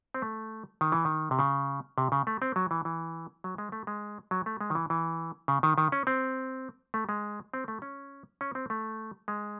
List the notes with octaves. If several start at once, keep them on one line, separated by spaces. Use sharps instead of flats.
C4
A3
D#3
E3
D#3
C3
C#3
C3
C#3
A3
C4
F#3
E3
E3
F#3
G#3
A3
G#3
F#3
A3
G#3
D#3
E3
E3
C#3
D#3
D#3
C#4
C4
A3
G#3
C4
A3
C#4
C#4
C4
A3
G#3